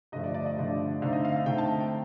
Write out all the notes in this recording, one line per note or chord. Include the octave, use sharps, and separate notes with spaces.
G2 D3 F3 A3 D#5
D5
D5
D#5
G2 D3 F3 A3
D3 A3 C4 D#4 F5
D#5
F5
F5
D3 A3 C4 D#4 G5
A5
A5
G5